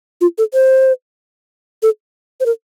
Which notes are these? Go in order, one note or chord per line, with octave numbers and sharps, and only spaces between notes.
F4
A4
C5
A4
C5
A#4